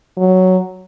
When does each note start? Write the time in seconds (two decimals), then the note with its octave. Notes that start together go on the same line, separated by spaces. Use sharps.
0.17 F#3